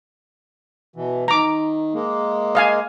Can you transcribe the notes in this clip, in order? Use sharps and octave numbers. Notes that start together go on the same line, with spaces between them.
B2 E3
D#3 A#5 D6
G#3 A#3
D#5 F5 G#5